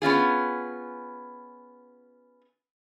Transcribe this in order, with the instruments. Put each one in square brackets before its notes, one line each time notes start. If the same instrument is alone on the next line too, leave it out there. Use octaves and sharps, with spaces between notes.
[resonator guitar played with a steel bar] B3 C#4 F4 G#4